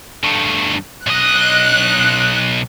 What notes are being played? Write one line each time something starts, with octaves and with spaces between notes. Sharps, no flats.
G2 A3
B1 D#5 F#6